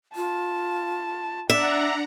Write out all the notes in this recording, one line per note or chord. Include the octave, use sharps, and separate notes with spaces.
F4 A5
D4 D5 E5 F#5 A#5